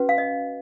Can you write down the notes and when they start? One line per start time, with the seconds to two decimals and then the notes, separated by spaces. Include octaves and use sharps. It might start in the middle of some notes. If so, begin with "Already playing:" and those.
Already playing: C#4 F#4 B4
0.09 F5
0.18 D#5